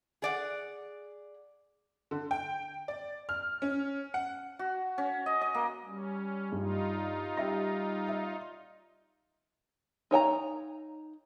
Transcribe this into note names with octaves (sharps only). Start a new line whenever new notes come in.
G#4 D5 F#5
D3
G5
D5
F6
C#4
F#5
F#4
C#4
D#5
D#5
A#3
G3 C#4
G2 D#4 F4
G3 G4 E5 A#6
E5
D#4 C#5 G5 A#5